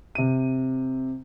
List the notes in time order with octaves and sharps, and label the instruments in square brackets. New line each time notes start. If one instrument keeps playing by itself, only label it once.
[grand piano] C3 D#7